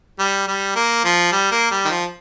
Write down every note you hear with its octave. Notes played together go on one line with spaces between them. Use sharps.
G3
G3
A#3
F3
G3
A#3
G3
D#3
F3